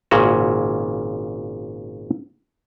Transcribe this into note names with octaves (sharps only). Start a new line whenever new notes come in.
G#1 A#2 C#3 C#4 F#4